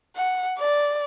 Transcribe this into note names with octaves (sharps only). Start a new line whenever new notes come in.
F#5
D5